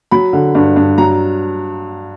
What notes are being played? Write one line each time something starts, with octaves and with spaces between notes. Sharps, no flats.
F#3 B5
D3
G2
G2
F#3 A#5